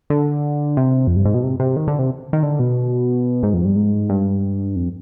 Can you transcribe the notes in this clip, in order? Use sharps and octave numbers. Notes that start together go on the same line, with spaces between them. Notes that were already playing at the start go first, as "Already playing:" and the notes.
D3
C3
F2
G2
G#2
B2
C3
C3
D#3
D3
C3
D#3
D3
B2
G#2
F2
G2
G#2
G2
F2